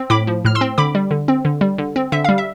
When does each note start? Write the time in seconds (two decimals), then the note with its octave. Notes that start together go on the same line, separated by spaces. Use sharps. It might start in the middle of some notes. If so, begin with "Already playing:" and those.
Already playing: C4
0.10 A2 B5 D6
0.27 F3
0.45 A2 F6
0.55 C6 E6
0.61 C4
0.78 D3 B5 D6
0.95 G3
1.11 D3
1.28 C4
1.45 D3
1.61 G3
1.78 D3
1.96 C4
2.12 D3 E5
2.24 G3 F5
2.38 E5